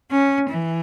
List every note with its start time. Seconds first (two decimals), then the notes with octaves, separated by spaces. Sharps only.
0.11 C#4
0.50 E3